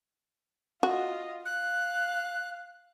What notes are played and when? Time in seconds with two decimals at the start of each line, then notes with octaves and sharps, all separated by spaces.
0.83 F4 F#4 D#5
1.45 F5 F#6